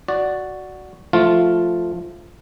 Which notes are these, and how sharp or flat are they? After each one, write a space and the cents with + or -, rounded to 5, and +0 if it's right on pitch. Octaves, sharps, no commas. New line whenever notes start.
F#4 +0 D5 +0
F3 +0 A3 +0 F4 +0